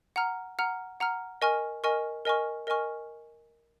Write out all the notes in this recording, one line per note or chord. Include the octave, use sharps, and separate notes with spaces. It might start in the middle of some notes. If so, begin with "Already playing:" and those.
F#5 A#5 F6
F#5 A#5 F6
F#5 A#5 F6
A#4 D#5 G#5 C#6 F6
A#4 D#5 G#5 C#6 F6
A#4 D#5 G#5 C#6 F6
A#4 D#5 G#5 C#6 F6